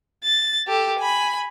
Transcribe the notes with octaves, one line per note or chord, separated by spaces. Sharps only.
A6
G4 A4
G#5 B5